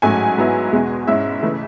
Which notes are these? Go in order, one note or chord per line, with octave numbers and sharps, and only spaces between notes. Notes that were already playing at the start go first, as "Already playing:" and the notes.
A1 G#2 F#3 A3 G#5
G#2 F#3 B3 E4
E2 B2 G#3
G#2 G#3 C#4 E4 E5
C#3 E3 A3